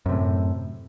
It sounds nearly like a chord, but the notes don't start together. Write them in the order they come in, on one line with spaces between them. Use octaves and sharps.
F#2 C3 A2